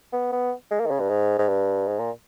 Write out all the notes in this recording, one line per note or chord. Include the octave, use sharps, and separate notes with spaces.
B3
B3
G#3
A#3
D#3
C#3
G2
G#2
G#2
G2
G#2
A#2